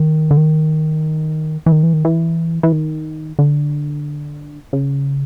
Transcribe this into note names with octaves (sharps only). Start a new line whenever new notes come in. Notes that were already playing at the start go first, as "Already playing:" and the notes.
Already playing: D#3
D3
D#3
E3
D#3
E3
D#3
E3
E3
D#3
D3
C#3